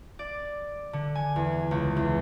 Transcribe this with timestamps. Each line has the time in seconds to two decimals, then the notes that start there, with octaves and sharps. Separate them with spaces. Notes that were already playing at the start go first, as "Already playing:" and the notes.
0.19 D5
0.93 D3
1.15 G#5
1.36 E2
1.71 C#2
1.96 E2